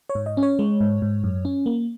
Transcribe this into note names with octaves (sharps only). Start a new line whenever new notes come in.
C#5
G#2
D#5
C#4
C#5
G#3
G#2
G#2
F#2
C#4
A#3